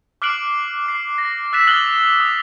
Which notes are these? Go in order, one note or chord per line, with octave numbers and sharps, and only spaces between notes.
D6 F6 F#6 C7 D7 F#7
D6 C7
A#6
E6 F#6 A6 B6 E7
D#6 F6 F#6 A6 F#7 G7
D#6